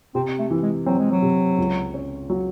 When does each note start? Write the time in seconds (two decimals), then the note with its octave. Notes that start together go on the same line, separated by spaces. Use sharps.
0.15 C3 C4
0.39 A3
0.51 E3
0.62 G#3
0.86 F#3 C4
0.99 G#3
1.11 F#3
1.22 C3
1.58 C#2
1.94 C#4
2.30 F#3